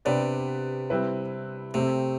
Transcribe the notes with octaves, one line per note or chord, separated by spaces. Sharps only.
C3 B3 D4 G4 B4 D5
G3 C4 E4 B4
C3 A3 C4 G4